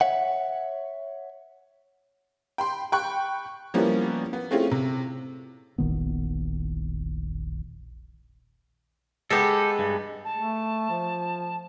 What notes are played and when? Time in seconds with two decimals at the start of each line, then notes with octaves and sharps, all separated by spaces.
0.01 C#5 E5 F#5
2.58 G5 B5 C6
2.92 G5 B5 C#6 F#6
3.74 F3 G3 A#3 B3 C#4 E4
4.33 B3
4.51 A3 C4 C#4 E4 F4 G#4
4.71 C3
5.78 E1 A#1 D#3 B3
9.30 G#3 B3 G4 A4
9.79 G2
10.24 A5
10.37 A3
10.90 F3